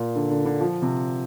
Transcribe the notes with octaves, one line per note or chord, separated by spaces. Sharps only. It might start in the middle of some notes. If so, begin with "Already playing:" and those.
Already playing: A#2
D3
D3
D3
F3
C3